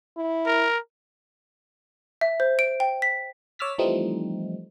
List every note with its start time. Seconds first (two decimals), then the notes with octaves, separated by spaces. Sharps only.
0.17 E4
0.47 A#4
2.21 E5
2.40 C5
2.59 D7
2.80 G5
3.02 B6
3.59 C#5 D6 E6 F6 A6 B6
3.78 E3 F3 G3 A3 C4 D#4